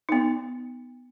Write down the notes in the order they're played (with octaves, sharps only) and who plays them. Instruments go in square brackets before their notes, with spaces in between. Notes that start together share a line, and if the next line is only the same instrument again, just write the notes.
[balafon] B3 D#4